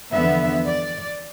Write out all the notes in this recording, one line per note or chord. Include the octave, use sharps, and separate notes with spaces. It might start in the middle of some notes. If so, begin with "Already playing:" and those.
E2 D3 F3 B3 E5
D5